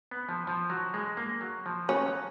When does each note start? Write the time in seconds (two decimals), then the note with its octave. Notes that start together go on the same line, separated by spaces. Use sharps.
0.11 B3
0.29 F3
0.47 F3
0.70 F#3
0.94 G#3
1.17 A#3
1.41 F#3
1.66 F3
1.88 F#3 C#4
2.06 F#3